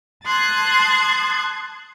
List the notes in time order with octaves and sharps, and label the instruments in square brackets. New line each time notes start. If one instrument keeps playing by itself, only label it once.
[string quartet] A5 C6 D#6 F#6 G#6